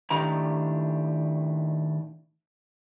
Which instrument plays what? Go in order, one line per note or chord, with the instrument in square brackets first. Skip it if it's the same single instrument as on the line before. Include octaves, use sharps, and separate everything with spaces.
[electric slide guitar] A2 D#3 A3 D4 G4 A#5